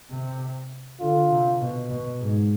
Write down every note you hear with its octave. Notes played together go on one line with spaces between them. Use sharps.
C3
D3 F4
C3
B2
B2
G#2